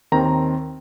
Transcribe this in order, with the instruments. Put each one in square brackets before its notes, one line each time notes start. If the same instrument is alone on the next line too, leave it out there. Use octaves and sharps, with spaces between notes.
[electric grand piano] D#2 D#3 C4 A#5